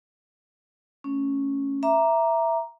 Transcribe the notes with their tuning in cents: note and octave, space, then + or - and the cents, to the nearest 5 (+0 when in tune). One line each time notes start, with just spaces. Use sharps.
A3 +0 C#4 +0
E5 +5 A#5 +0 D6 +0